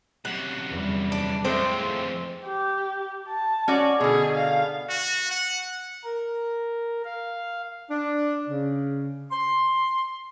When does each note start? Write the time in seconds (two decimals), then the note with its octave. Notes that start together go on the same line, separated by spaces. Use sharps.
0.25 F#2 C3 F#5
0.68 E2 G3
1.12 D4
1.45 F2 A2 E3 G#3 C4 C5
2.46 G4
3.29 A5
3.68 C#4 F#4 D5
4.01 B2 D3 G#4
4.36 F5
4.89 F#4
5.31 F#5
6.04 A#4
7.05 F5
7.91 D4
8.49 C#3
9.31 C6